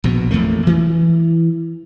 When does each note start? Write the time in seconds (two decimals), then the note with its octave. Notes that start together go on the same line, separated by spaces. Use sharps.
0.04 A#1 B2
0.31 A1 F2 A3 A#3
0.67 E3